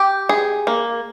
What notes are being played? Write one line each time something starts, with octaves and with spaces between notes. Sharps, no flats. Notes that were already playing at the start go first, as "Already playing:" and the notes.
Already playing: G4
G#4
A#3